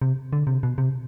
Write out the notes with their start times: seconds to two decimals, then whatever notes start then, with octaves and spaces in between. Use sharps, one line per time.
0.02 C3
0.33 D3
0.47 C3
0.63 B2
0.78 C3